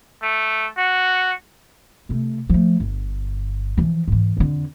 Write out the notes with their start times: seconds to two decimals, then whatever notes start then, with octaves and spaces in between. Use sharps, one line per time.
0.23 A3
0.78 F#4
2.09 C3 A3
2.49 F3 A3
2.80 G1
3.77 E3 F3
4.08 G#2 E3
4.37 F2 D3